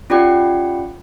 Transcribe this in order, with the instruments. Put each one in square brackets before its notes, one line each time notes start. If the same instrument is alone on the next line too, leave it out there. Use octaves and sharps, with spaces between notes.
[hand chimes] C#4 F4 G4 D5 F#5 G5